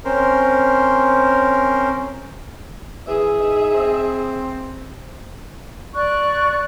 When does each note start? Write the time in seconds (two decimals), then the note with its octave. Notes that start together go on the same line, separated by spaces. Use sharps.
0.05 C4 C#4 A#4 C5
3.07 E3 G#4 E5
3.40 D#4
3.74 C4
5.95 D5 C#6 F#6